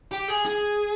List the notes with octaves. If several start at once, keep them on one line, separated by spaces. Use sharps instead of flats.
G4
G#4
G#4